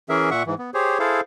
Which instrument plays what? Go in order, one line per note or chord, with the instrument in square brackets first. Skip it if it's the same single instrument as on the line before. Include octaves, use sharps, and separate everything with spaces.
[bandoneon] E3 C#4 G#4 A#4 E5
A#2 E5 F#5 C#6
G#2 E3
B3
G4 G#4 C5 C#5
E4 G#4 A4 C5 F5